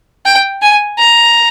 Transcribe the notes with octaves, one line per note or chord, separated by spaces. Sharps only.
G5
G#5
A#5